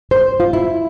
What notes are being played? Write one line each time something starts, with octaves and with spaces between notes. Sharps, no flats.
C5
F4
E4